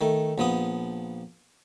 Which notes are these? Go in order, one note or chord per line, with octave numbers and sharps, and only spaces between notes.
D#3 A3
A#1 F3 B3 D#6